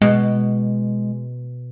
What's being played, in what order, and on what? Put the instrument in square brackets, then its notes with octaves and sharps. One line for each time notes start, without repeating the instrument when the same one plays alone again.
[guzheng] B2 [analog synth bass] G#3